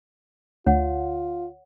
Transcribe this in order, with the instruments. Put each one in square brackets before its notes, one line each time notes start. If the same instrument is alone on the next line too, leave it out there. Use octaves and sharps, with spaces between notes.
[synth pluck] D2 [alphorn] F4 [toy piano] C#5 F#5